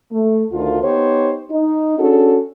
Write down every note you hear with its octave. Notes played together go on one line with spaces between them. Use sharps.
A3
D2 D#3 F4
B3 D#4 G4 C5 C#5
D#4
C#4 D4 F#4 G#4 A4